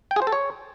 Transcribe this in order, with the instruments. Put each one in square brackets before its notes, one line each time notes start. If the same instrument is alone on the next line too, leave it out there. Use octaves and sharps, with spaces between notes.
[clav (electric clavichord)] G5
G#4
C5
A4
C#5